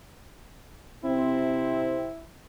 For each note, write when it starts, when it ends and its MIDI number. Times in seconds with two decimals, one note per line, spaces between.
1.04 2.09 48
1.04 2.09 60
1.04 2.26 64